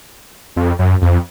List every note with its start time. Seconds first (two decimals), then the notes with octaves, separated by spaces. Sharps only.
0.56 F2
0.79 F#2
1.02 F2